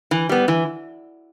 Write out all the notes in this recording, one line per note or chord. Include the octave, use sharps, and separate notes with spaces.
E3
G3 B3
E3